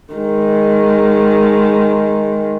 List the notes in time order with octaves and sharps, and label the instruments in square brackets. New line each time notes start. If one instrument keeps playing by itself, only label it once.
[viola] D#3 G#3